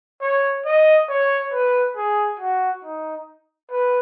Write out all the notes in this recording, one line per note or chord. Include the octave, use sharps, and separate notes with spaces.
C#5
D#5
C#5
B4
G#4
F#4
D#4
B4